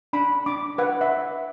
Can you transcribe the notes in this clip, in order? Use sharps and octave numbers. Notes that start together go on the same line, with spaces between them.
D4 B5
D4 D6
B4 F#5
E5